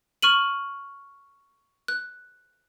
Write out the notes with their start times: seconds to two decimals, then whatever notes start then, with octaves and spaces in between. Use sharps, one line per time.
0.22 C#6 F6 D#7 F#7
1.88 F#6